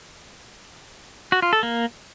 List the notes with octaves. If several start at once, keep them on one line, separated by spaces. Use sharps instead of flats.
F#4
F4
A4
A#3